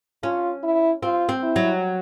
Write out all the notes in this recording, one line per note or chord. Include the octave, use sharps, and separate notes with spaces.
C#4 F4
E4
C4 F4
C4
E4
F#3